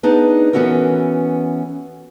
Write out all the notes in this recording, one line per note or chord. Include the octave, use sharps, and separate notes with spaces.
B3 D4 D#4 G#4
E3 B3 C#4 F#4 A4 A#4